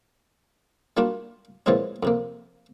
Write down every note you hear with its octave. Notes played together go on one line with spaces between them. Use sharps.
G3 A#3 D4 F4 F#4
A#2 E3 F3 G#3 C4 C#4
F2 C3 A#3